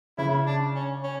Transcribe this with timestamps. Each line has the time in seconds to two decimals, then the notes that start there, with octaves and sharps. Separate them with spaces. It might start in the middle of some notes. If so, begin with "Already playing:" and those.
0.18 C#3 E4
0.47 D4
0.75 C#4
1.04 C#4